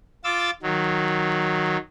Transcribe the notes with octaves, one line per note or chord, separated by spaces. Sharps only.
F4 D6 E6 A6
D#3 F#3